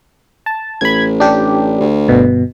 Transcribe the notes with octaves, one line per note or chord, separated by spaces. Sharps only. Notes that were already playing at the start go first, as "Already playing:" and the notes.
A5
A1 B5 G#6
D4 G4
D2
G1 B2